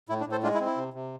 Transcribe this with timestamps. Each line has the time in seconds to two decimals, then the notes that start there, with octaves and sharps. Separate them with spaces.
0.09 A2 E4
0.20 D4
0.26 A2
0.31 A4 C5
0.43 G#3 D4 F4
0.54 E4
0.60 C4
0.66 E4
0.77 C3
0.94 C3